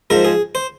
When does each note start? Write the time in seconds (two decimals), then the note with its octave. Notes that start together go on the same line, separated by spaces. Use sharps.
0.10 G#2 F3 A#4
0.25 G#4
0.55 C5